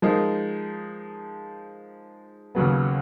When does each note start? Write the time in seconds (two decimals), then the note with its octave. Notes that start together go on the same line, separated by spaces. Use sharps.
0.02 F3 G#3 D#4 A#4
2.55 D#2 C#3 F#3 B3